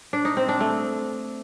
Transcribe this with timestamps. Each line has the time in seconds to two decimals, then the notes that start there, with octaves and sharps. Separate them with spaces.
0.13 D4
0.25 D#4
0.37 C4
0.49 D4
0.60 A3